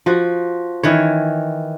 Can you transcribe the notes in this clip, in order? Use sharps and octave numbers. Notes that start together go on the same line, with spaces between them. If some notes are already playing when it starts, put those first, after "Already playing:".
F3 F#4
D#3 E3 C#5